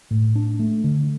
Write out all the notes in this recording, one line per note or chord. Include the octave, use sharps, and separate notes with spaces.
A2
D4
A3
D3